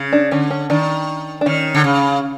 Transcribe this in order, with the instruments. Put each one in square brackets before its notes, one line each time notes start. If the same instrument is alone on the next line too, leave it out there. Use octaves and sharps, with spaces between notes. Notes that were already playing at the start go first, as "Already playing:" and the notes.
Already playing: [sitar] C#3
[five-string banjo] D4
[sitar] D3 [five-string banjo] C#4
[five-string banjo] C#4
[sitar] D#3 [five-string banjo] D4
[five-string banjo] D4
[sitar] D#3 [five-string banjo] C#4
[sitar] D3
C#3